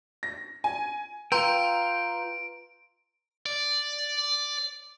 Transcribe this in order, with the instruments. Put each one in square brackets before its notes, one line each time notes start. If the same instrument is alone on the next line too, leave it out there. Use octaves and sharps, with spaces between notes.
[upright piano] A#6
G#5
[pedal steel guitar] F4 G5 [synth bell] B4 A#5 C6 [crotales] D7
[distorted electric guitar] D5